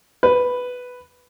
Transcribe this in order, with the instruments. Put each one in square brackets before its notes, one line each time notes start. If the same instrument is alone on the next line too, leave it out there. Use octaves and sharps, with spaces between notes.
[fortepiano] B4